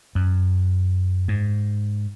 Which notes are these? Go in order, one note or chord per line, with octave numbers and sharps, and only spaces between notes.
F#2
G#2